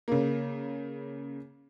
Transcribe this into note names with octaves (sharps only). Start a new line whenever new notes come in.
C#3 A#3